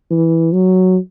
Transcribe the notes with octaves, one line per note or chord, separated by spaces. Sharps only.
E3
F#3